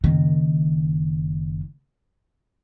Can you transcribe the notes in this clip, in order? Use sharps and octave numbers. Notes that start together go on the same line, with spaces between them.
F#1 D#3